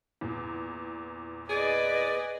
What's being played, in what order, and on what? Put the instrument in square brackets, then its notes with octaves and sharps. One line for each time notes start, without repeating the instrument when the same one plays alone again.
[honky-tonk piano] E2 A#2
[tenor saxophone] G#4 [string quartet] B4 D#5 [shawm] D5